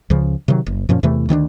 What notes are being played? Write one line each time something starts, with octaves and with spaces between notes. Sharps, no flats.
C#2 C#3 F3
C3 D#3 F#3
F#1
F#2 A#2 F3 C#4
E2 C3 E3 A3
D2 D#3 A#3 D4